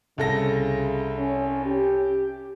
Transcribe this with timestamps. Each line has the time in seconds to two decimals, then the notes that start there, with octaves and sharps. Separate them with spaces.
0.18 C2 C#3 A4 A#6
1.17 C#4
1.66 G4